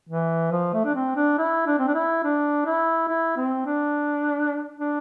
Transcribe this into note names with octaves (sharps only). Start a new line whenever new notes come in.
E3
F3
A3
D4
C4
D4
E4
D4
C4
D4
E4
D4
E4
E4
C4
D4
D4